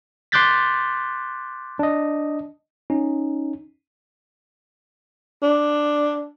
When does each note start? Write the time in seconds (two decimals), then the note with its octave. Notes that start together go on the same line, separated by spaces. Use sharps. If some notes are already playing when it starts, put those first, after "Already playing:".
0.32 C6 D6 F#6 G6 A6 B6
1.79 D4 D#5
2.90 C#4 D#4
5.42 D4